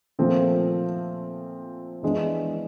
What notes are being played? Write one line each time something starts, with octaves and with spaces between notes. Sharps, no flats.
A#2 F3 A3 C4
E3 G#3 B3 D4